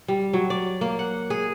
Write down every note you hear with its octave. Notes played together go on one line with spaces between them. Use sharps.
G3
F#3
D5
A#3
F#5
G#4